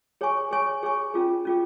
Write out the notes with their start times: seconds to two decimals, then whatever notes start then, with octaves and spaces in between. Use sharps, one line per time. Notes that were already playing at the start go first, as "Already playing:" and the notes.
0.21 G#4 C#5 G#5 C#6
0.51 G#4 C#5 G#5 C#6
0.83 G#4 C#5 G#5 C#6
1.14 C#4 F4 G#4
1.45 C#4 F4 G#4